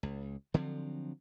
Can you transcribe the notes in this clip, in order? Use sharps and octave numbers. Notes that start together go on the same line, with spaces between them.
C#2
D3 F3 F#3 C4